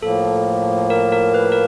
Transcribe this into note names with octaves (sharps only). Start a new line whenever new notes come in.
A2 F3 A#3 A4
A#4
A#4
B4
A#4